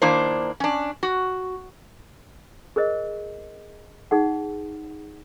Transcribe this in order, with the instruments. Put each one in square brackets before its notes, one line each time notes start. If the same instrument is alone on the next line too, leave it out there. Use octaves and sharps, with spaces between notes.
[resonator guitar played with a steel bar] D#3 A#3 D4 E4 C5
C#4 D4
F#4
[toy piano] G#4 A#4 C5 D#5
D#4 G#4 F#5